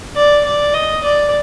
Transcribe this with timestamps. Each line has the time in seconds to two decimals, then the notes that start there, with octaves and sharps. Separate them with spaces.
0.16 D5
0.45 D5
0.74 D#5
1.04 D5